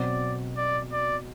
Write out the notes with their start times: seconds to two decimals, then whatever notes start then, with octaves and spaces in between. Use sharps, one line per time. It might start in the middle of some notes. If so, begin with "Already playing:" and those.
Already playing: B2 F#3 C4 F#4 D5
0.57 D5
0.92 D5